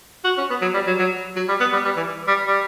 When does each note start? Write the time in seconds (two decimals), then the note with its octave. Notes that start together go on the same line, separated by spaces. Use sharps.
0.25 F#4
0.38 C#4
0.50 B3
0.62 F#3
0.74 G3
0.87 F#3
0.99 F#3
1.36 F#3
1.49 G3
1.60 B3
1.73 G3
1.85 G3
1.97 E3
2.28 G3
2.47 G3